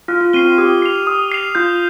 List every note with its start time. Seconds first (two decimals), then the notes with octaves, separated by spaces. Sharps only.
0.08 F4 F6
0.21 F4
0.33 C4 C7 D#7 G7
0.45 F4
0.58 G4 D#6
0.82 C7 F7
1.07 D#6
1.32 C7 F7
1.55 F4 G6